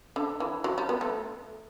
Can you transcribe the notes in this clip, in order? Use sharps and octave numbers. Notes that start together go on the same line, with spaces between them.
D3
E3
F#3
G3
B3
A3